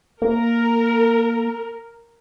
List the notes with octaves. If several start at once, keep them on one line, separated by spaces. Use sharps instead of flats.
A#3 A#4